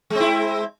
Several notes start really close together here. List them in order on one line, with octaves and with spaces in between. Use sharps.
G#3 C4 E4